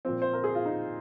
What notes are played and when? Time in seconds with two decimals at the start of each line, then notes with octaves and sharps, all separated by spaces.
0.05 A#2 F3 C4
0.22 C5
0.33 A#4
0.44 G#4
0.55 F4
0.66 D#4